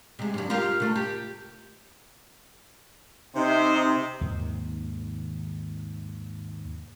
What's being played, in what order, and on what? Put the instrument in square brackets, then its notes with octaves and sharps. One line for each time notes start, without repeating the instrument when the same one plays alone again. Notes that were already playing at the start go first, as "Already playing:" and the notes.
[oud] C3 G#3
G2 F#3
F4 G4 A#4
C3 A3
G4
[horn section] C3 [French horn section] C4 [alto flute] D#4 [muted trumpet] C5
[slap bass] D#2 G#2 C3 D#3